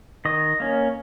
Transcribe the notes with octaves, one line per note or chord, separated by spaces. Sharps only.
D#3 D#5
A#3 C#4